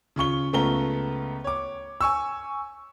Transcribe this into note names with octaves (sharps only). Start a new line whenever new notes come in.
C#3 F4 C#6 G7
C#2 A3 B3 F4 A#5 G7
C#5 D6
G#5 C#6 E6